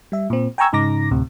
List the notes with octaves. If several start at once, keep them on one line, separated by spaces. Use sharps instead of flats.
G3 E5
A#2 C4
G5 G#5 A#5 C#6 E6 G#6
G#2 C#3 D#4 A#5 D6 A#6
D2 A2 C3